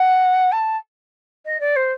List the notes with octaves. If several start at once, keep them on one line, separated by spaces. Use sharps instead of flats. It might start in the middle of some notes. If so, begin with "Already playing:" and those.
Already playing: F#5
A5
D#5
D5
C5